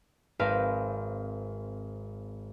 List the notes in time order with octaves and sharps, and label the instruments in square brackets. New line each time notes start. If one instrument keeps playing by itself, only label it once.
[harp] G#1 C4 A#4 B4 F5